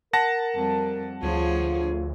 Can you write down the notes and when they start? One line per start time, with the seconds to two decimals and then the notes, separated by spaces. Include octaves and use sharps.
0.13 A#4 F#5 A5 A#6
0.55 F2 G3
1.23 D2 F3 F4 G#4 C#5